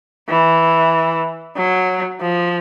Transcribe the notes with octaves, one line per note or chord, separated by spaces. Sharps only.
E3
F#3
F3